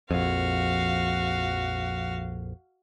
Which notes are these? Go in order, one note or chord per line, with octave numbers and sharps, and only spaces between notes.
A#1 F2 F#4 F5